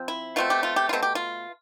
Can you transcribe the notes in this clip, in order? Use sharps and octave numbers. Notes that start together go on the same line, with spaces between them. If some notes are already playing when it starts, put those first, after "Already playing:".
Already playing: F3 C4
E4
B2 A3 C4 F4
G4
F4
G4
F4
B2 A3 C4
G4
F4